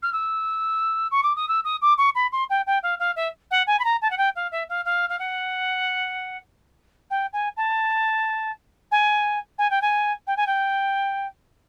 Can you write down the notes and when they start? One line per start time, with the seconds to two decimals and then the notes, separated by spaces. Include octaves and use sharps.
0.02 F6
0.13 E6
1.11 C#6
1.23 D6
1.36 D#6
1.48 E6
1.64 D#6
1.82 D6
1.98 C#6
2.15 B5
2.32 C6
2.50 G5
2.67 G5
2.83 F5
2.99 F5
3.16 E5
3.51 F#5
3.67 G#5
3.79 B5
3.84 A#5
4.02 A5
4.10 F#5
4.18 G5
4.36 F5
4.52 E5
4.69 F5
4.85 F5
5.09 F5
5.19 F#5
7.10 G5
7.33 G#5
7.57 A5
8.91 G#5
9.58 G#5
9.70 G5
9.82 G#5
10.27 G5
10.37 G#5
10.47 G5